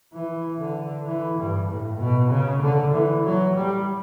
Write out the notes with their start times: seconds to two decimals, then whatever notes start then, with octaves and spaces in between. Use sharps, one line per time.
0.13 E3
0.59 D3
1.06 E3
1.37 G2
1.69 A2
2.00 B2
2.31 C#3
2.62 D3
2.93 E3
3.24 F#3
3.56 G3